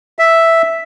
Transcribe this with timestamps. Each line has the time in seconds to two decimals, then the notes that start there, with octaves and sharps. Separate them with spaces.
0.19 E5